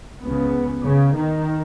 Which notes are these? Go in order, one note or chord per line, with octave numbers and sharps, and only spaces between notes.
C#2 C#3 B3
C#3
D#3